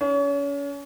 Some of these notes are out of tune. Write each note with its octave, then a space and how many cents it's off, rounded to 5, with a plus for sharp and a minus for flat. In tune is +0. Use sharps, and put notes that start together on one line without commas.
C#4 +35